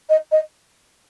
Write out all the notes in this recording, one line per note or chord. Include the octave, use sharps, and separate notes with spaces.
D#5
D#5